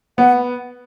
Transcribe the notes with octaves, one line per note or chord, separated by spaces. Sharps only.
B3 F#5